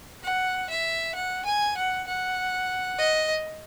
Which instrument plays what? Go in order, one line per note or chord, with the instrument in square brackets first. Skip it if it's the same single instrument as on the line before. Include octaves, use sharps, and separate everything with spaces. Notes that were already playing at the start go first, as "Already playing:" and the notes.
[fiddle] F#5
E5
F#5
G#5
F#5
F#5
D#5